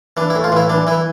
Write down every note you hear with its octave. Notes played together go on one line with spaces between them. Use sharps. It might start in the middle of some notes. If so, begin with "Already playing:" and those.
E3 D4
E4
A2
F4
E3 E4
E3 D4
E3 E4